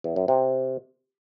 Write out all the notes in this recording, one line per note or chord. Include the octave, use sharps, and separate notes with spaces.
E2
F#2
C3